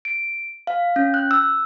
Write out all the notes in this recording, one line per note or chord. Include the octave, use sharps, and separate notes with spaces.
D7
F5
C#4
F#6
E6